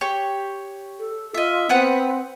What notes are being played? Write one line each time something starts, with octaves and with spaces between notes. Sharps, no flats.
G4 C#5
A4
F4 D#5 E5
B3 C4 B4 F#5